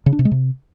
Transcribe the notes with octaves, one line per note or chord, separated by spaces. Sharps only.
C#3
D4
C3
G#3
C3